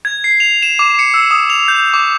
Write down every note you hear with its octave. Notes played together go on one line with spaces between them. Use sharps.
G#6
C7
F7
E7
D6
C#7
E6
D#6
F7
G6
D6